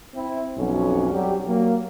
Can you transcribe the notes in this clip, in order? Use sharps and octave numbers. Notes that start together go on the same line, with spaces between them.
C4 E4
B1 F2 C#4 F#4
F#3 G3 G4
F#3 A#3